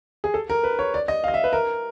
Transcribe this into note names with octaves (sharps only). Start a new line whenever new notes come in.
G#4
A4
A#4
B4
C#5
D5
D#5
F5
D#5
E5
B4
A#4